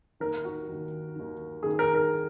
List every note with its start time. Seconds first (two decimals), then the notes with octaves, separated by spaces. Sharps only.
0.20 D#3 A#4
0.25 D#2
0.45 F#4
0.69 D#2 D#3
1.16 D#2 D#3
1.63 D#2 D#3 G#4
1.79 A#4
1.95 A#4